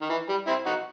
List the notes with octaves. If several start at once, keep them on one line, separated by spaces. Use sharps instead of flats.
D#3
E3
G3
C4 E4
D#4 F#4